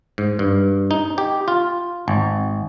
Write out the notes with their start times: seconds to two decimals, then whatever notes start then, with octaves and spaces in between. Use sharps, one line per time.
0.18 G#2
0.39 G2
0.91 D#4
1.18 G4
1.48 F4
2.08 G#1